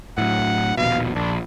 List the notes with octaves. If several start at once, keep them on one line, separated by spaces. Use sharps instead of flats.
A2 F#3 F#5
D#1 A#1 B2 F5
A#1 D4